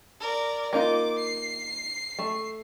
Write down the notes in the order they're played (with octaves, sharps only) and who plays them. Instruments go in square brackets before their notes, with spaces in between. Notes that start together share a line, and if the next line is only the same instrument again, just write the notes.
[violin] A#4 D5
[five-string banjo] A#3 D#4 F4 [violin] D6
[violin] C7
[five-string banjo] A3